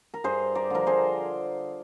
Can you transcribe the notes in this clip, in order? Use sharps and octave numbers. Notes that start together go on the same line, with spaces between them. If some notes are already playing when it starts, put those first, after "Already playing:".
A#4
G2 G#4 C5
A#4 D5
D3 F3 A#4
G#4 C5